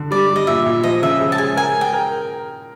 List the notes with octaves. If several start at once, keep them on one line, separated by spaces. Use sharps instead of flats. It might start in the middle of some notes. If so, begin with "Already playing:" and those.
Already playing: D3
G3 D5
G3
D#5
A#2 E5
A#2
F3 D#5
C#3 E5
G#3
A5
G#3 G#5
A#4 G#5
G#3
G5
A#4